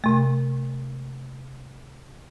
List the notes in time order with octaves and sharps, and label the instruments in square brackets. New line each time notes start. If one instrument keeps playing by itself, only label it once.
[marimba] C3 A3